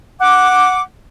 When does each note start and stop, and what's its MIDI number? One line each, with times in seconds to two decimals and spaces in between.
0.21 0.81 78
0.21 0.81 86